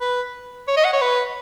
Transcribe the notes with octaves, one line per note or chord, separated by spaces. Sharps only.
B4
C#5
D#5
F#5
C#5
B4